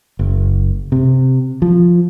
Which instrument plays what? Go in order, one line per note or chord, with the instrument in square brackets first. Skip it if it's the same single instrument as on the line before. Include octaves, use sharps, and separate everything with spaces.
[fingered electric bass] F#1
C3
F3